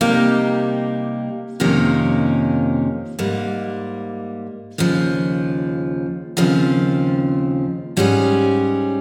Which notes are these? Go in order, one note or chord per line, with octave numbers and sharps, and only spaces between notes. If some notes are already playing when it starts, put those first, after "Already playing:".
C3 G3 A#3 D#4 G4
F2 C3 D#3 A#3 C#4
G#2 G3 A#3
D#2 C#3 F3
D#2 C#3 F3 C4
G#2 G3 C#4 G#4